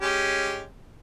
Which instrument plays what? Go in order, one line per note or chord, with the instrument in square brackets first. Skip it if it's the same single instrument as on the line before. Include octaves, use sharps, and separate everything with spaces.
[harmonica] G#3 C#4 G4